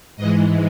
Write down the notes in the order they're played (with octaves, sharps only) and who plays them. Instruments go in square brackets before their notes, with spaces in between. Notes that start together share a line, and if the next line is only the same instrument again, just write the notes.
[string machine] G#2 E3 G#3 D#5